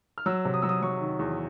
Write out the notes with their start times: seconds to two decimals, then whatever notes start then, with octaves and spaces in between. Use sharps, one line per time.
0.18 F6
0.26 F#3 E6
0.45 C3
0.54 D#6
0.62 F#3 E6
0.69 D#6
0.82 F#3 C#6
1.00 D#3
1.19 E2